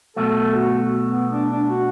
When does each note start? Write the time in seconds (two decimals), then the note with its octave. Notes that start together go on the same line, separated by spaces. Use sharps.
0.16 B1 B2 A3 A4
0.39 A4
0.54 F#4
1.11 B3
1.31 D4
1.50 D4
1.69 F#4